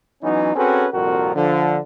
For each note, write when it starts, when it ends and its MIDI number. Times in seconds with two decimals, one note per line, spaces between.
0.23 0.51 52
0.23 0.51 54
0.23 0.51 59
0.23 0.51 61
0.23 0.51 63
0.56 0.88 60
0.56 0.88 61
0.56 0.88 66
0.56 0.88 68
0.56 0.88 69
0.56 0.88 71
0.94 1.32 36
0.94 1.32 41
0.94 1.32 46
0.94 1.32 66
0.94 1.32 70
1.35 1.79 50
1.35 1.79 53